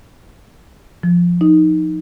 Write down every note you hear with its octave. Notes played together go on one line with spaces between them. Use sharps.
F3
D#4